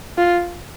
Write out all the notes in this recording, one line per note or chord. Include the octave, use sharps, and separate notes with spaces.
F4